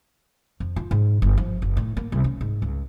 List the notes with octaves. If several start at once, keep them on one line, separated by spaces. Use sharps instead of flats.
F2
F4
G#2
G1
F3
F#1
A2
A#3
C2
C#4
G#2
C#2